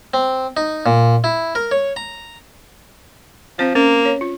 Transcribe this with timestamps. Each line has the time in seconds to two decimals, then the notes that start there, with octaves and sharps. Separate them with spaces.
0.14 C4
0.57 D#4
0.86 A#2
1.24 E4
1.55 A#4
1.71 C#5
1.96 A#5
3.59 F3 C4 C5
3.75 A#3 C#4
4.05 C#5
4.21 F4